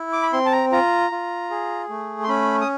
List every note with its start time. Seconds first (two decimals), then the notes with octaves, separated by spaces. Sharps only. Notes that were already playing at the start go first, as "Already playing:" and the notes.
Already playing: E4
0.13 D6
0.23 B5
0.33 C4 C6
0.46 A5
0.52 A#5
0.72 F4 A#5
1.11 F4
1.50 G#4
1.89 A3
2.23 C6
2.29 C#4 B5
2.61 D#6